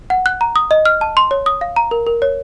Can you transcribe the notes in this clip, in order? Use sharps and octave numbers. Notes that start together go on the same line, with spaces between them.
F#5
F#6
A#5
D#6
D#5
F6
A5
C6
C#5
D#6
F5
A#5
A#4
A#4
C#5